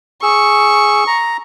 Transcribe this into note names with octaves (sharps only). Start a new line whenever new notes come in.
G#4 C#6 E6
A#5